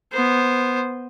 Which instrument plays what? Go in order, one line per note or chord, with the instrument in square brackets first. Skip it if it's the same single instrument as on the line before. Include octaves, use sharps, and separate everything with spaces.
[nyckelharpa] B3 C5